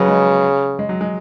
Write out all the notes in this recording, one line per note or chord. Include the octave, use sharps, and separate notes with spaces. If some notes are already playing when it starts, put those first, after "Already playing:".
Already playing: C#3 F#3 B3
G#3
G#3
F#3
G#3